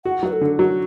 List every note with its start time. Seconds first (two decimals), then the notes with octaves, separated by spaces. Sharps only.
0.05 F#4 F#5
0.23 F#3 B4
0.32 A4
0.41 D3
0.59 F#3 F#4